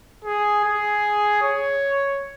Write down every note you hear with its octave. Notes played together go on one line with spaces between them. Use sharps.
G#4
G#4
C#5